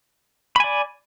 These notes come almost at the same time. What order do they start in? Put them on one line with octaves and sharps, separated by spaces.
B5 G#5 D5